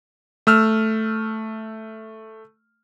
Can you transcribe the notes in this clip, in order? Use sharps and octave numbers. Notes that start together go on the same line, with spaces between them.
A3 E6 F6